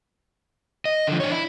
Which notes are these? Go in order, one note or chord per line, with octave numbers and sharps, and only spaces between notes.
D#5
D3 F3
D4 C#5
E4